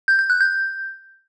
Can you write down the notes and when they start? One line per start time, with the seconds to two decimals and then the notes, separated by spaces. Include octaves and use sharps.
0.08 G6
0.19 G6
0.30 F#6
0.40 G6